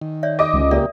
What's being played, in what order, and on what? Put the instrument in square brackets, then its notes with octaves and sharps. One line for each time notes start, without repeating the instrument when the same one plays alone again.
[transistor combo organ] D#3
[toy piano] C#5 D5 E5
[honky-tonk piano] D#5 D6 D#6
[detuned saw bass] C#2
[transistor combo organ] C#3 A#3 G4 [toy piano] A#4 D5 E5